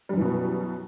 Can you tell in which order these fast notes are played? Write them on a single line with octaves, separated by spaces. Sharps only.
G3 F#2 E3 B2 B3